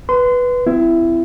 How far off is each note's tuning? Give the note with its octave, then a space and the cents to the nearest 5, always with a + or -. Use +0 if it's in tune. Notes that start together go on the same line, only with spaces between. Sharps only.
B4 +0 C6 -25
C4 -30 E4 +20